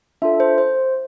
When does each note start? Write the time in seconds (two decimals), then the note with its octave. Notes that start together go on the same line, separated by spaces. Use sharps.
0.22 D4 F4 A4 E5
0.40 C5
0.58 C5